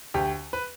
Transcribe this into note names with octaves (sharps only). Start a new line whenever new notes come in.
D2 G4
B4